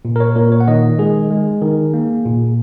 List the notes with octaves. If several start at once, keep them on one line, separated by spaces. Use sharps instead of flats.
A#2
A#4
C#5
A#2 A#4
C#5
F#5
D#3 D#5
G#3 G#4
G#3
D#3
A#3
A#2